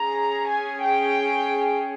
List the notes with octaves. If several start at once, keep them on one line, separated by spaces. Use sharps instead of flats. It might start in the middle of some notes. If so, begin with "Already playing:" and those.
Already playing: C#4 G#4 A#5
G#5
G5